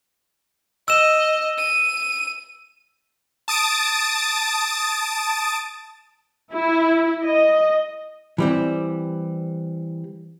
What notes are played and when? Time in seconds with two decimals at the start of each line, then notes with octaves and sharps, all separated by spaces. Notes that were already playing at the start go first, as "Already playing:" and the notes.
0.88 D#5 E6 E7
1.58 D#7
3.48 A5 D#6 A6 D7
6.53 E4
7.24 D#5
8.38 E3 G3 C4